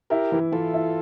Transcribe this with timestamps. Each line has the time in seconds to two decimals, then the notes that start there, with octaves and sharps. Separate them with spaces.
0.10 E4 G4 A#4
0.32 E3
0.52 E3 F4 A4
0.74 E4